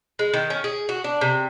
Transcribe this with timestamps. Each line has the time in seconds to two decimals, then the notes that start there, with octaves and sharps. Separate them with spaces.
0.19 G#3
0.34 D#3
0.50 C#4
0.64 G#4
0.89 F#4
1.04 D4
1.21 C3